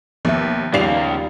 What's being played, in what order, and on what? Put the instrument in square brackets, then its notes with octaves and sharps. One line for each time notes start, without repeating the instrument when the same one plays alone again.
[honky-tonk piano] D#2 [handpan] F3 B3 E5
[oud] D#2 D5 [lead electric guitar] C#3 F4 [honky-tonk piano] G3 C7 F7